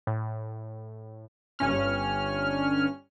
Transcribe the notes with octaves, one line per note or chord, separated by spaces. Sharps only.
A2
G1 G2 C#4 F6